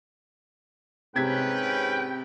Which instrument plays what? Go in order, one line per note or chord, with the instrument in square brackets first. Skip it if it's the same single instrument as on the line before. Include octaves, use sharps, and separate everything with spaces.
[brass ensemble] G#2 C#4 B4 [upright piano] C3 G#6 B6 [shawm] G5